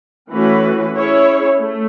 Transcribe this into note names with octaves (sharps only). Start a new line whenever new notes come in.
E3 A3 C#4 F#4 B4
C#4 E4 G#4 C#5
A3